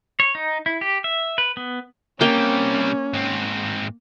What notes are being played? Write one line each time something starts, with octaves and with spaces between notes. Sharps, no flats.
C#5
D#4
E4
G4
E5
B4
B3
C3 G3 A#3 C#4 G5
G#2 C4